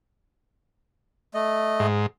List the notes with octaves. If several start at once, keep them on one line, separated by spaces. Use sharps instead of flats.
A3 D#5
G#2